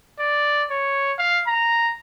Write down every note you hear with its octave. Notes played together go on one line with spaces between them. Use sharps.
D5
C#5
F5
A#5